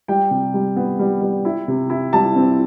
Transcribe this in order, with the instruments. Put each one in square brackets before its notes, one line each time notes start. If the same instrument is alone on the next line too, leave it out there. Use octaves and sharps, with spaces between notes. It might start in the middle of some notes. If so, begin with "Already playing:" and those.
[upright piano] G3 G5
C3
G3
B3
G3
G3
E4
C3
E4
G3 A5
C4